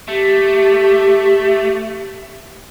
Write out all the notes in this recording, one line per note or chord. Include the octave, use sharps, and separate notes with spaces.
A3 G4